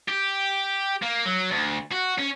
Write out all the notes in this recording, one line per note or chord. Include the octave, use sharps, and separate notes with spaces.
G4
A#3
F#3
D2
F#4
C#4